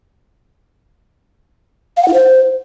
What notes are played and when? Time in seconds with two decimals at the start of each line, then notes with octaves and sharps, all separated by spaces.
1.97 F5
2.02 F#5
2.08 E4
2.14 C5